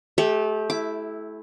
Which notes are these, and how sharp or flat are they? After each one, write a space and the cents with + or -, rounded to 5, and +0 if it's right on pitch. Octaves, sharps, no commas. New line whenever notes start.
A3 -30 G4 +0
E4 +0 D6 +0